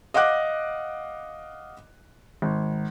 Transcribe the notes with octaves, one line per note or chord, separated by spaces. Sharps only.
D#5 F5 F#5 D6 F#6
G#1